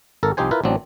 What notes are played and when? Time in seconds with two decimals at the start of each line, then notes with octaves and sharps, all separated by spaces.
0.23 G#1 A4 A#4
0.37 C2 F3 D#4 G4 C5 G#5
0.51 E4 F4 A#4 B4
0.64 A1 F#3 C4 D4